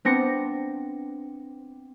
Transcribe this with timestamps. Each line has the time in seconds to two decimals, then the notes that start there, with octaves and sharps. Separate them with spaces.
0.05 B3 C4 D4 A#6 C#7